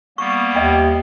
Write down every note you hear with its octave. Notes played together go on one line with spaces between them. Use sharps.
G3 A#3 B3 C#6
D#2 D#5 E5 G5